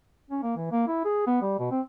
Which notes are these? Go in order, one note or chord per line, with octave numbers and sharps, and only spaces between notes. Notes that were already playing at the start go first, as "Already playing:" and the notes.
C#4
A#3
E3
A#3
E4
G#4
B3
G3
B2
C4